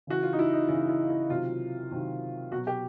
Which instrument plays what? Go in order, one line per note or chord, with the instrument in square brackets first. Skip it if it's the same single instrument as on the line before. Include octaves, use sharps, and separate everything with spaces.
[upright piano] C#3 E3 F#4
F4
D#4
E4
D#4
C#3 E3 E4
E4
E4
C3 D#3 F#3 F4
C3 D#3 F#3
B2 F#4
F#3
G4